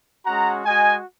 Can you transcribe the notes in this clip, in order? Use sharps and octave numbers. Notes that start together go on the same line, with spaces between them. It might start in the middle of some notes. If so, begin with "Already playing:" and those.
G#3 C#4 F#4 F#5 A#5
G#3 F#4 D#5 G#5